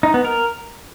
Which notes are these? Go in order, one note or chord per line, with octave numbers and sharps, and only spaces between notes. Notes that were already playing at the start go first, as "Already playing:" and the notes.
D#4
B3
A#4